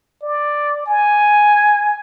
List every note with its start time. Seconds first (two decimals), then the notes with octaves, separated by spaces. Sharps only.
0.23 D5
0.86 G#5